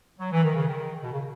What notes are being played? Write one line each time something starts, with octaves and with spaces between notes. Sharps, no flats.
F#3
E3
D#3
C#3
D#3
B2
C#3